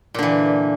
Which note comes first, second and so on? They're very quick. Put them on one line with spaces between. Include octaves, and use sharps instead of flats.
A#2 D3 E3